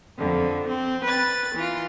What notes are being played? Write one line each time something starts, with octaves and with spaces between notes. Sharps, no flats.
F2 D3
C4
B4 A6
E3 F4